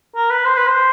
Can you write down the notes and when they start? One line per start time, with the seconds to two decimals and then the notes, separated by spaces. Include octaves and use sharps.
0.16 A#4
0.30 B4
0.45 C5
0.56 B4
0.67 C5